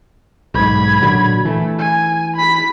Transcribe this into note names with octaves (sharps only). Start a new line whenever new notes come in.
B1 G#2 B5 G#6
A#2 D3 F#3
E3 A3
G#5
B5 B6